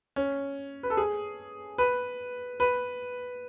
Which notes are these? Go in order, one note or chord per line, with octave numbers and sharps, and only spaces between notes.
C#4
B4
A4
G#4
B4
B4